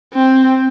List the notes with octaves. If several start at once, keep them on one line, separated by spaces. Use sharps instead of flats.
C4